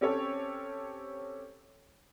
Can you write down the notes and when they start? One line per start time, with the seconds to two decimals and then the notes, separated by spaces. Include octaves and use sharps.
0.01 C4 C#4 G4 A4 C#5